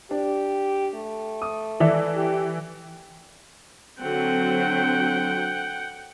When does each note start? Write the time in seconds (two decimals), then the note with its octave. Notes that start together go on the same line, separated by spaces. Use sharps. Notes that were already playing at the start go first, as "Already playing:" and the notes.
0.11 D4 G4
0.95 A3
1.42 D#6
1.80 E3 A4 D5 E5
2.16 G4
4.01 D3 F#3 C4 F#5 G5